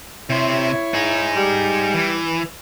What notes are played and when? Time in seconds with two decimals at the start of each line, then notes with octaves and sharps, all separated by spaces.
0.30 C3 E4 C5 C#5
0.94 D#4 G#4
1.36 G3
1.94 E3